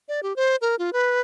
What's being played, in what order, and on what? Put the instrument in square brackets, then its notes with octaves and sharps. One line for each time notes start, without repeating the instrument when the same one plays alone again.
[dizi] D5
G4
C5
A#4
F4
B4